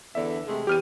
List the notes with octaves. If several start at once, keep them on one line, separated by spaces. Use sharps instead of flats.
E2 D3 D4 E5
C3 G#3 A3
E2 G4 F6 D#7